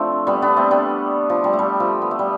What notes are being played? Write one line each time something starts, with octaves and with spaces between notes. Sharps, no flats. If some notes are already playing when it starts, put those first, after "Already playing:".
Already playing: F3 A3 C4 D4
G3 B3
B3 D4
A3 C4
G3 B3
F3
G3
A3
G3
F3
B3
A3
G3